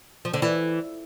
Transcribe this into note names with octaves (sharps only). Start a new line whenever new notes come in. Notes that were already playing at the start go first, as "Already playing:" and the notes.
F3
D3
E3